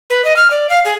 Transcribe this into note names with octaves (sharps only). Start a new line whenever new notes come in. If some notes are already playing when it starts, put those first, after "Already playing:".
B4
D#5
F6
D5
F5
G#4